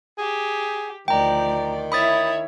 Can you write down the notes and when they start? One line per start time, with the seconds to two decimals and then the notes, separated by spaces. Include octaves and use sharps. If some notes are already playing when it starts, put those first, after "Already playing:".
0.18 G4 G#4
1.08 D2 D#3 F3 D5 G5 A#5
1.92 E4 C#5 E5 B5 D#6 A6